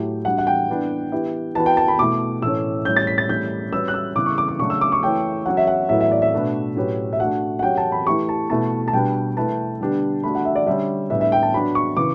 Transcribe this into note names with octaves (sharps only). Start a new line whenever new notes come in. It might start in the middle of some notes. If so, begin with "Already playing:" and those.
Already playing: A2 F#3 A3 E4 G4
G3 D4 F#4 F#5
F#5
G5
E3 B3 D4
E3 B3 E4 G4
E3 B3 F#4 B4 A5
G5
A5
B5
B2 A3 E4 D6
A2 E3 A3 C#4 E6
A2 G3 C#4 G6
A6
B6
A6
A2 G3 C#4 G6
G3 C#4 F#4 B4 E6
F#6
E6
C#3 E3 G3 B3 D6
C#6
D6
D6
C#3 F#3 A3 D4 F#4 C#6
E6
D6
C#6
E3 A3 C#4 G5
F#3 C#4 F#4 F#5
E5
F#5
A2 F#3 B3 E4 A4 E5
E5
D5
E5
B2 A3 D4 F#4 B4
A2 F#3 C#4 G4 B4
E5
A3 D4 F#4 F#5
F#5
F#3 C#4 G4 G5
A5
B5
E3 A3 E4 G4 C#6
A5
B2 A3 E4 B4 A5
A5
B2 G3 D4 G4 B4 G5
A3 E4 B4 A5
D3 G3 B3 D4 G4
A3 D4 F#4 B5
F#5
E5
D5
D3 G3 C#4 G4 E5
A2 G3 B3 D4 G4 E5
E5
G5
A5
F#3 B3 D4 F#4 B5
C#6
C#3 E3 B3 D6